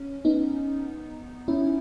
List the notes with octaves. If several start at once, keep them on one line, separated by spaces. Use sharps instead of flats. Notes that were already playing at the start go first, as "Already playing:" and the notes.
Already playing: C#4
B3 D#4
C#4 E4